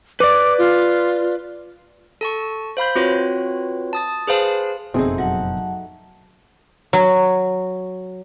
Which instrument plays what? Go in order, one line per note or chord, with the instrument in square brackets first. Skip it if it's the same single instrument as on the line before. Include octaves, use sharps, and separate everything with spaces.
[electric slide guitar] B4 D5 [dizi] D6
[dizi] F4
[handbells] A4 A5 C#6
C5 F5 B5 G6
C4 F4 F#4 B4 C#5
A5 D#6 A6
G#4 B4 C5 F5 A5
[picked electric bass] F#1 F2 B2 [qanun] A3 D#4 [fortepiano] C4 G#4
[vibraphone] F#3 F#5 A5 [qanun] F#4
[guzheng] F#3